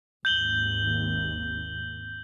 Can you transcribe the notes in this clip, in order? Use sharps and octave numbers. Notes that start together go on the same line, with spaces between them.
G#1 D#2 G6 F#7 G7